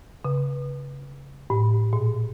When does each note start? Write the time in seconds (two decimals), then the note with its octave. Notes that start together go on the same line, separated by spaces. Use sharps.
0.25 C#3
1.50 A2
1.93 A#2